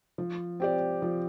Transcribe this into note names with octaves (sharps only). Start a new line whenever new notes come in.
F3
C4 G4 D5
F3